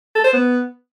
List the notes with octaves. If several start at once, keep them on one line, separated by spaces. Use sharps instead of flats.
A4
C5
B3